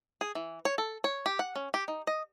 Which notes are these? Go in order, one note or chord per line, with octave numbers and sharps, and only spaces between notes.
G#4
E3
C#5
A4
C#5
G4
F#5
C#4
G4
D#4
D#5